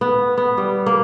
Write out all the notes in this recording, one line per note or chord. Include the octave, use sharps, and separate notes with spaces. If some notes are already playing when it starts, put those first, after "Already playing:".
B3
B3
G3
A#3